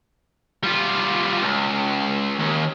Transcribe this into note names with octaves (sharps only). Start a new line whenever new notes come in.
G3 F4
C#2
D#2